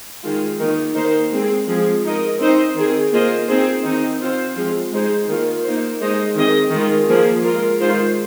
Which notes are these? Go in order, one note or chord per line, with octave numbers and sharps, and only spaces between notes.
D#3 G#3 F4
D#3 A#3 D#4
D#3 A#3 D#4 C5
G#3 C4 G#4
F3 G#3 C4 G#4
G#3 D#4 A#4 D#5
C4 D#4 C5 D#5
D#3 C4 G#4
A#3 F4 G#4 C5 D#5
C4 D#4 G#4 C5
D#3 C4 D#4
C4 F4 C5
F3 G#3 C4 F4
G#3 D#4 G#4 C5
D#3 A#3 F4
A#3 D#4 C5
G#3 D#4 C5 D#5
D#3 C4 G#4 D#5
D#3 G#3 F4
F3 A#3 G#4
G#3 F4 A#4
D#3 G#3 F4 C5